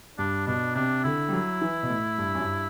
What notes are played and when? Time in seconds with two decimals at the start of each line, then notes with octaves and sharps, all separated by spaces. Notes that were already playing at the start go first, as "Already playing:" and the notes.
0.18 G2 D4
0.47 B2 D4
0.75 C3 D4
1.04 D3 E4
1.29 G3
1.33 F#3
1.62 E3
1.83 B2
1.90 A2
2.18 G2
2.35 F#2
2.41 G2